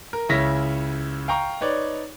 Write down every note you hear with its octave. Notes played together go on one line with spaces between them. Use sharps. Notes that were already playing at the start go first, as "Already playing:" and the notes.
A#4
C#2 C#3 E4 C#5 A#6 B6
F5 G5 A#5 C#6
D#4 B4 C#5 D5